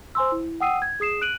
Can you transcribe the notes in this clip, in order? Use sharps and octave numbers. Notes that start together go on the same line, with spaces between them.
C5 G#5 C6 E6
E4
F#5 G5 D#6 E6 C7 D#7
G#6
G#4 D#6 C7 E7
F#6 D7 D#7 F#7